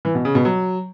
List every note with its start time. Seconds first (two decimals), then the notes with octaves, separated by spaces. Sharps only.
0.05 E3
0.15 B2
0.25 C#3
0.35 B2
0.45 F#3